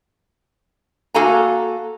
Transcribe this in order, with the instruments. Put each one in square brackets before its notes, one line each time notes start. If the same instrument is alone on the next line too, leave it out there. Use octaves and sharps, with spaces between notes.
[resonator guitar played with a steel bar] A#3 F#4 A4 F5 G#5 A#5